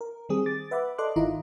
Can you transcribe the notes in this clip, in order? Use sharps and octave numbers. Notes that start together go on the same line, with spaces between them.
A#4
D#3 G3 C4 G#4 D#6
D6 A6
B4 E5 F#5 B5 D6
A4 D5 D#5 C6 D6 F#6
G#1 D#3 E4 F4 D#5 A#5